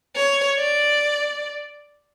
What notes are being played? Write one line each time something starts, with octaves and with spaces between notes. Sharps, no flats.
C#5
D5